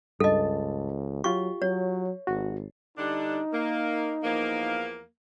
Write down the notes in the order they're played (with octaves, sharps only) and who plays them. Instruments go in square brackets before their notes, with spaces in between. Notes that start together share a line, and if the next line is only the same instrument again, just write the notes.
[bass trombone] C#2 [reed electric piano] G2 A5 [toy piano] A4 D#5
[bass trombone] F#3 [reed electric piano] F4 G4 [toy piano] C#6
[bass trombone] F#3 [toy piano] C#5
[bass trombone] G#1 [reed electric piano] F#4
[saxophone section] D3 G3 D4 [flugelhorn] D#4
[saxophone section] A#3
E2 F3 A#3